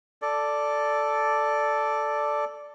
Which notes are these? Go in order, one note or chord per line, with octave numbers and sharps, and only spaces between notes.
A4 D5